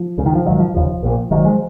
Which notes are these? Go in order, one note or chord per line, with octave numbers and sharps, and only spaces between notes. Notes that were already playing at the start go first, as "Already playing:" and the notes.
Already playing: F3
C#2 C#3
D#3
F3
A#1 G#2 D#3 F#3
F3
F1 D#2 C#3 F3
A#1 A#2
G#1 G#2 D#3 F#3
F3 G#3